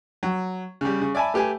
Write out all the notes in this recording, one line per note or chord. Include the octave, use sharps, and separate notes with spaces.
F#3
C#3 G3
C#3
D5 E5 G#5 A5 B5
A3 G4 B4 G#5